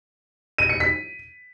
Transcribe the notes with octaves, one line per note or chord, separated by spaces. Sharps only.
D#7
C#7
B6